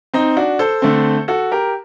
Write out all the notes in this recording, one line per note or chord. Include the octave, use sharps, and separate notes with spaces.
C4 D#4
D4 F#4
A4 C5
D3 A3 C4
F#4 A4
G4 A#4